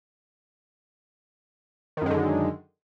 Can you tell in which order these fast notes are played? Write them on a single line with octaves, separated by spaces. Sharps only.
D#3 F#2 G#3 D3